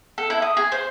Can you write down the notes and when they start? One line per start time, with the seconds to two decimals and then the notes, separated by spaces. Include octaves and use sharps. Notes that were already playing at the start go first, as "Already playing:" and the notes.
0.18 A4
0.30 E4
0.42 D#6
0.57 G#4
0.72 C5